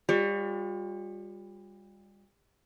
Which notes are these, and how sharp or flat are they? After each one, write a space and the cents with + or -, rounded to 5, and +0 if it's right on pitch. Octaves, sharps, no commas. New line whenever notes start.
G3 +35 F4 +45 C#5 +20